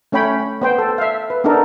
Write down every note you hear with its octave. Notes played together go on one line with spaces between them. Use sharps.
A3 C#4 C#5 G5 B5
B3 C5 G5
A4
E5 F5
B4
B3 D4 D#4 A4 A#4